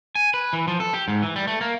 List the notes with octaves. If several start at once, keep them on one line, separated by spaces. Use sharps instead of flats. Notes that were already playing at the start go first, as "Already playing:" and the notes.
G#5
B4
E3
F3
A4
G4
G#2
E3
G3
A3
A#3